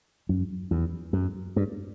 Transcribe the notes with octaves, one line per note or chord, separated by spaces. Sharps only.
F#2
E2
F#2
G2